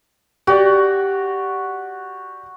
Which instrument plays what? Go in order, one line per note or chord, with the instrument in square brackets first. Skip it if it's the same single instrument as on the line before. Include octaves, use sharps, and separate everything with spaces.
[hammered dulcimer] F#4 [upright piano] G4 D5